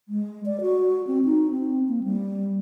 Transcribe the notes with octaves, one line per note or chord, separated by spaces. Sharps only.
G#3
D5
F#4
C4
D#4
C4
A#3
G3